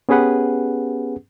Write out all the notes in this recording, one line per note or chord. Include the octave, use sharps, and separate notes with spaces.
B3 C#4 G4 G#4 B4 F#5